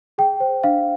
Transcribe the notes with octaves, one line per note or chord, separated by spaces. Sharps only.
G#4 G5
C5
D4 F5